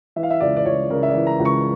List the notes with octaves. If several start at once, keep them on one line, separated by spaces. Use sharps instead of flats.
E3 E5
F5
E5
C#2 D5
D5
C#2 C#5
C#3 A#4
E5
D5
E3
A#5
C#2
C#6